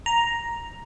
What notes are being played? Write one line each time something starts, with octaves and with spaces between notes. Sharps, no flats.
A#5